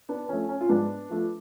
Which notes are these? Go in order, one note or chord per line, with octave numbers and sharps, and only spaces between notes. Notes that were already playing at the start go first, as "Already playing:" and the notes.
B3 D4
F3 A3 C#4
C#4
F4
G#2 B3 D4
F3 A3